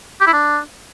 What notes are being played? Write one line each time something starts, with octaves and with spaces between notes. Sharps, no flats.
G4
E4
D4